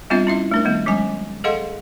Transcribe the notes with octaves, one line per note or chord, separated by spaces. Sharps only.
G3 B3 C4 D4 F4 E5
C#4 E4 E5
A3 D4 A#4
D#3 G3 A3 B3
F#3 G#3 C#4 G#5
G#4 A4 D#5 F5 F#5 C6